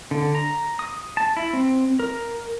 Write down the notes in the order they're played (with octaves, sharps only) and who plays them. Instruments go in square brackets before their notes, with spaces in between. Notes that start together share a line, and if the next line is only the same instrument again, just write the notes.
[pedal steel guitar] D3
A#5
D#6
A5
E4
C4
A#4